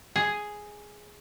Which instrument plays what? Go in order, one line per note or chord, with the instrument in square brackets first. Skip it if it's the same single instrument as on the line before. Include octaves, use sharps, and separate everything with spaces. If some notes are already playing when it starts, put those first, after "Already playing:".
[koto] G#4